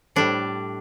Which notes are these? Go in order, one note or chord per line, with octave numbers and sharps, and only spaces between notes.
A2 G3 D4